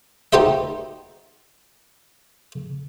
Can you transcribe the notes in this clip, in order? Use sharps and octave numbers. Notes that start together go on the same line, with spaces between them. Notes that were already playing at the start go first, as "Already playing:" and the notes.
D#4 F#4 G4 C5 D#5 E5